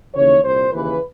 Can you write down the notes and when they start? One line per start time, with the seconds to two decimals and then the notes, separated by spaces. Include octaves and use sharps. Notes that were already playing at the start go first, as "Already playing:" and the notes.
0.14 D#2 C#3 E3 C#5
0.43 C2 A#2 C5
0.72 D#2 C#3 E3 B4